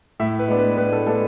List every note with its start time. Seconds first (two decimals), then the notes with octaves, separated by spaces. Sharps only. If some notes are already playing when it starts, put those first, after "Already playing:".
0.20 A2 E5
0.39 B4
0.48 G#3 B3 D4
0.59 B4
0.77 A2 B4
0.93 A4
1.06 G#3 B3 D4 A4